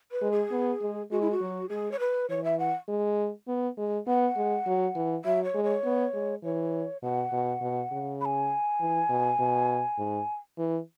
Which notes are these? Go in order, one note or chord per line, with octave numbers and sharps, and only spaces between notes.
B4
G#3
G#4
B3
G#3
G#3 F#4
E4
F#4
F#3
G#3 G#4
C#5
B4
E3 C#5
E5
F#5
G#3
B3
G#3
B3 F#5
G#3
F#3
E3
F#3 E5
C#5
G#3
C#5
B3
G#3
E3 C#5
B2 F#5
B2
B2
C#3
B5
G#5
E3
B2
B2
G#2
E3